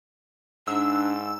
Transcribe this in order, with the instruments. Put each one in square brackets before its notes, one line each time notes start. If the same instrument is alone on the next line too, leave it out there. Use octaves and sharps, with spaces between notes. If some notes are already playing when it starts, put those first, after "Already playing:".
[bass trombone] G#2 [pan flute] D4 [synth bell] E6